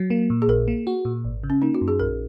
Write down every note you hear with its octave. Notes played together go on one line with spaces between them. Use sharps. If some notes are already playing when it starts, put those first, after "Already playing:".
Already playing: F#3
A#3
A#2
G#4
A#1 A#4
A#3
F#4
A#2
G#1
C#3
C#4
A#3 D#4
F#4
F#2
G#4
A#1 A#4